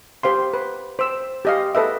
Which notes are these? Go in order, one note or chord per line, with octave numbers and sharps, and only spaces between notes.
G4 C5 F5 C6
B4
C5 E6
G4 D#5 F5
A4 B4 D#5 E5